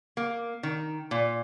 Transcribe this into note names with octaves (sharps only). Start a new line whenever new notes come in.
A#3
D#3
A#2